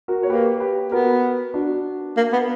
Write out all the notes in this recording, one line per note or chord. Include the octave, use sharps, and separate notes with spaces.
F#4 A#4
C#5
A#3 G4 B4
G4 B4
B3 F#4 A#4
D4 F#4
A#3
B3